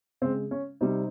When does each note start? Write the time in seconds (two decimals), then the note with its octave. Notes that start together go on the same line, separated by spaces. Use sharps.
0.21 C#3 G#3 C4
0.51 C#4
0.81 C3 G3 C4 D#4